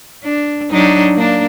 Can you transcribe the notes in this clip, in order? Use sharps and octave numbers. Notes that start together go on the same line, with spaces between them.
D4
F#3 D4 D#4
A#3 D4